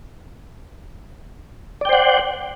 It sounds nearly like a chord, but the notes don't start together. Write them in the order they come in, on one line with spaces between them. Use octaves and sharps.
D5 G5 C5 F#5